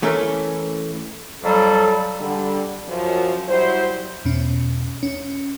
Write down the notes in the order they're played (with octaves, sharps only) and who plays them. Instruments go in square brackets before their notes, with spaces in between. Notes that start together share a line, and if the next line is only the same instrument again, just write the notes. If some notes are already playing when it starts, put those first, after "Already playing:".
[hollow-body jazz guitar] E3 A3 C#4 A4 A#4
[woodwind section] F2 F#3 G3 [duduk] A4
[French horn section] D3 G3
F#2 F3 F#3
F#3 G3 E4 C5
[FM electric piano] E2 B2 C#4
C#4